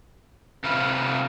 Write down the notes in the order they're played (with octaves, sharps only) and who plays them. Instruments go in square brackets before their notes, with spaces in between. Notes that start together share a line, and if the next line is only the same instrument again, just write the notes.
[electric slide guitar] C3 A3 F4 B4